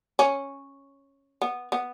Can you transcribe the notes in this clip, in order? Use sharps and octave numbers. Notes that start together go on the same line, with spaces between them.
C#4
B3
B3